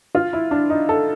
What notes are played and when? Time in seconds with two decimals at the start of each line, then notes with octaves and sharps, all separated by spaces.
0.15 F4
0.33 E4
0.51 D4
0.70 D#4
0.89 A4